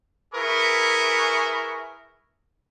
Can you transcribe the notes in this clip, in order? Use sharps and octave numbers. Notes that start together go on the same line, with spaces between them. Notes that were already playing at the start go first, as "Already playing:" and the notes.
E4 G#4 A#4 B4 C#6